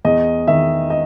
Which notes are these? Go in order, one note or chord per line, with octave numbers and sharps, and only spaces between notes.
E2 D#5
D#3 E5
D#5